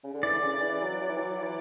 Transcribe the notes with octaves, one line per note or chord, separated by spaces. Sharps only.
C#3
D3
E3 D5
D3
C#3
E3
F#3
F#3
E3
F#3
E3